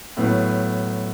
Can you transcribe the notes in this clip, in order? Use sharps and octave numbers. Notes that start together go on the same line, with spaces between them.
A2 F#3 B3